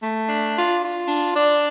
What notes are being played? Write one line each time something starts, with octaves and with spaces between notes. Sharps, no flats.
A3
D4
F4
F4
D4
D4